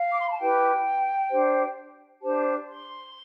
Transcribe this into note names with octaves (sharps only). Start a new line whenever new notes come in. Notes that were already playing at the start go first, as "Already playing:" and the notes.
Already playing: F5
D6
C6
B5
A5
E4 G4 B4 G5
D4 G4 C5
D4 G4 C5 A5
C6